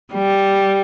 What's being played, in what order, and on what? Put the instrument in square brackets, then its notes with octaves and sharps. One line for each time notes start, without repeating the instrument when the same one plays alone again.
[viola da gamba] G3